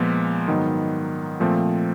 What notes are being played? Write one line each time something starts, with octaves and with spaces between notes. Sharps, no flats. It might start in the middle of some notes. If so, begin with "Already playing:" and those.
Already playing: A#2 F3 G#3 B3
G#2 D#3 F#3 B3
A#2 F3 A3 C4